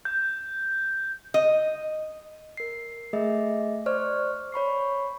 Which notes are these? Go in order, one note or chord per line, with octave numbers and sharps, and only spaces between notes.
G6
D#5
A#4 C7
A3 G#4 D#5 E5
C5 D5 C#6 F6
C#5 B5 C#6 C7